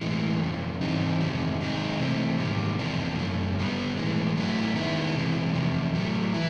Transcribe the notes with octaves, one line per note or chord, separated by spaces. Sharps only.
A2 E3 G#3
F2 C#3 F3
G#2 E3 G3 C4 D#4
F2 C3 D#3 G#3
C3 D#3 G#3 C4 D#4
C3 E3 A3 C4
G#2 D#3 G3 A#3
E2 C3 F3 A#3 D4
F#2 C#3 F3 A3 C#4
G2 D3 G3 B3 D4
A2 E3 G#3
A2 F#3 A3 C#4 E4
D#3 G#3 B3 E4
C3 E3 G#3
E2 C3 F3
A2 F#3 A3
E3 E4